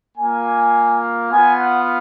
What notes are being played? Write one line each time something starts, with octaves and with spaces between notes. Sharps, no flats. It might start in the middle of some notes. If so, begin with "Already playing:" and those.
A#3 F4 G#5
B3 F4 G#5
F#5